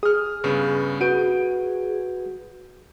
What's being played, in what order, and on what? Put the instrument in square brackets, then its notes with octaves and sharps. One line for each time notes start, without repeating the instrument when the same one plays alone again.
[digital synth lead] G#4 [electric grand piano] D#6 F6
[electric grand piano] G2 C#3 B3
[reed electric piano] F#4 B4 [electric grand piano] G6 D7 D#7